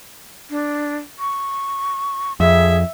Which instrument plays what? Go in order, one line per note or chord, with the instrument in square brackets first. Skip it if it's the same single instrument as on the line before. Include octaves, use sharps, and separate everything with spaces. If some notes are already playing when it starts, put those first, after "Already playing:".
[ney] D4
C#6
[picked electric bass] F2 [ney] G#4 [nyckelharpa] E5